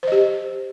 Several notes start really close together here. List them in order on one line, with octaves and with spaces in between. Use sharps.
C5 D#5 G4